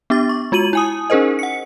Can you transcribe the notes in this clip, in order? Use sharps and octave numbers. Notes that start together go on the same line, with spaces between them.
B3 D4 G4 D6 A6
C#6
G#3 F4 F#4 D#7 F#7
E4 G#5 D#6
C#4 D#4 G#4 A#4 C5 D#5
F#5 C#7